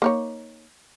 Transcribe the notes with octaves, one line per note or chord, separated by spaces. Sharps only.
A#3 D#4 C#5